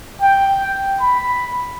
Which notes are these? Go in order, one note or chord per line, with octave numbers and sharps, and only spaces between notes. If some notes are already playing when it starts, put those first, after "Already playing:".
G5
B5